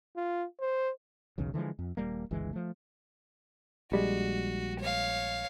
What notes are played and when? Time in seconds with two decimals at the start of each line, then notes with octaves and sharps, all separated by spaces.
0.16 F4
0.60 C5
1.38 B1 E2 C#3
1.54 D3 E3 F3 G#3
1.79 F2
1.97 D#1 G3 A#3
2.31 G1 C#2 E3 G#3
2.53 F3 A3
3.92 A#1 G3 G#3 F#4
4.80 C#5 F5